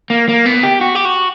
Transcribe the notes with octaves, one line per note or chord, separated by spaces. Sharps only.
A#3
A#3
B3
G4
F#4
G4
F#4